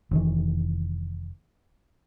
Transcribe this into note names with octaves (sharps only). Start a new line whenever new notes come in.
F1 D#3 E3